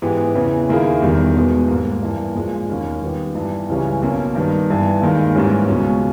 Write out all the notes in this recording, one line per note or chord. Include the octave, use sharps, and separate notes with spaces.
G#2 E3 G#3 B3 G4
E2 C#3 E3
D#2 D#3 A#3 E4 G#4
E1 E2 D#3 G3
E2 B2 G#3 B3
G#2 G3 A#3
G2 E3 A#3
A#1 A#2 G#3
E1 D#2 D#3 A#3 C#4
D#2 D#3 G3 B3 G4
G2 E3 G3
C#2 C#3 E3 G3 C#4
B1 B2 A#3 C#4
G2 D#3 G3 B3
G1 G2 E3
D#2 D#3 G#3
G#2 E3 G3 A#3 C#4
C#2 B2 G#3 C#4